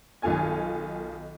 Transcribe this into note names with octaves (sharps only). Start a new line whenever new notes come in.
B1 D#3 F4 A4 G#5 G#6